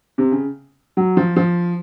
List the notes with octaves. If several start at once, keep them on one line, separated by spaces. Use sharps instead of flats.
C3
C#3
F#3
F3
F3